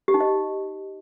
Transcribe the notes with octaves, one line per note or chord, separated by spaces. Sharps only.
G4
D#4
D#5